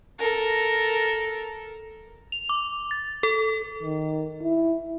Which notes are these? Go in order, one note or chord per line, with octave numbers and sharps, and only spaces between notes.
A4 A#4
F7
D6
A6
A4
D#3
E4